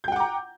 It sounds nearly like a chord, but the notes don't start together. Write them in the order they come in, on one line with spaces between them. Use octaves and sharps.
G6 G5 F#5 D6 A#5